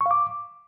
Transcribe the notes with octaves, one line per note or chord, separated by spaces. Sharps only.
C#6
F5
D6